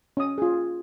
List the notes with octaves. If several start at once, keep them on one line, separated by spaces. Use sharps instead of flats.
C#4 D#6
F4 G#4